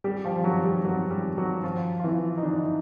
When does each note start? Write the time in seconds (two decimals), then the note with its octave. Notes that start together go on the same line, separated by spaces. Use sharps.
0.04 G3 G4
0.25 F3 F4
0.44 F#3 F#4
0.64 G3 G4
0.84 F#3 F#4
1.11 G3 G4
1.38 F#3 F#4
1.63 F3 F4
2.00 F4
2.04 E3 E4
2.38 D#4
2.43 D3 D4